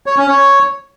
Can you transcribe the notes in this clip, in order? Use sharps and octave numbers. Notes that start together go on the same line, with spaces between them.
C#5
C#4
C#5